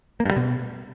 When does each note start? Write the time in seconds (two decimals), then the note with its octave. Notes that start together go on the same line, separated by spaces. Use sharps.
0.20 A#3
0.25 G2
0.31 G3
0.36 B2